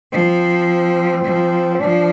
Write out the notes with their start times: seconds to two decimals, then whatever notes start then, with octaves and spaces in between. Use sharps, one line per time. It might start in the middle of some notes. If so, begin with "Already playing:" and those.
0.12 F3 C4
1.24 F3
1.75 C4
1.81 F3 D4